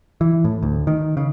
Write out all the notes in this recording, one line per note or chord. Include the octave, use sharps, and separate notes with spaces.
E3
A2
D2
D#3
C#3